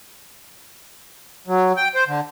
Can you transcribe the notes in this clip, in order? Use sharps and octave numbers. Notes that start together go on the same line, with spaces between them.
F#3
G5
C5
D3